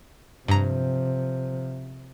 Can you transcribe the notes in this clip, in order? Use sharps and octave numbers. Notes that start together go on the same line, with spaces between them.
G2 C3 F3 A#5